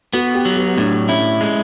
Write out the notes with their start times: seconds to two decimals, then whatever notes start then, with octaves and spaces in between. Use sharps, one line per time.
0.13 B3 F#4
0.34 G4
0.45 F#3
0.56 F#4
0.77 A2 D4
1.09 C#4 E4
1.41 G#3